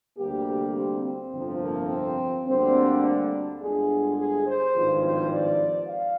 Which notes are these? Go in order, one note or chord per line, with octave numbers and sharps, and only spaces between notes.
D2 C3 G3 A#3 G4
C4
C4
G1 F2 C3 F3
A#3
C4
D2 D3 G3 A#3 C4
D4
G1 G2 D3 G#3 G#4
G#4
C5
G#1 G2 F3
C5
D5
F5